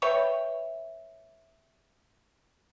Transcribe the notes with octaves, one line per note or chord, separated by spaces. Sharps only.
B4 C#5 E5 G5